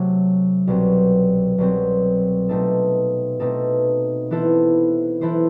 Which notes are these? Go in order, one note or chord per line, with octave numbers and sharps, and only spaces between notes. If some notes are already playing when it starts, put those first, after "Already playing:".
Already playing: C3 F#3 A3
C2 B2 F#3 C4
C2 B2 F#3 C4
B2 A3 C4 D#4 A4
B2 A3 C4 D#4 A4
E3 B3 E4 A4 C5
E3 B3 E4 A4 C5